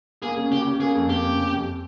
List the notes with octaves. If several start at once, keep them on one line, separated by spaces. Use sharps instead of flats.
A#3 G#4
C#3
C#3 G4
C#3
A#3 G#4
F2
A#3 G4
C#3
C#3
F2